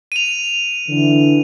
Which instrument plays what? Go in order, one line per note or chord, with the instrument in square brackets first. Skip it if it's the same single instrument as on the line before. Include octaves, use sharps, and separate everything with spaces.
[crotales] D#7 F7
[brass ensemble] D3 E3